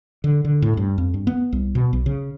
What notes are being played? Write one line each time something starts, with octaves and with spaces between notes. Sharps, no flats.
D3
D3
A2
G2
F2
G2
B3
C2
B2
B1
C#3